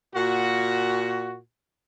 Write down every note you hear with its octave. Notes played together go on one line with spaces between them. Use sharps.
A#2 F#4